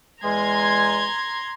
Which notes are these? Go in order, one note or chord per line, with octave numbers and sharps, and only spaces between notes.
E2 G#3 G#5 A#5 C6 G#6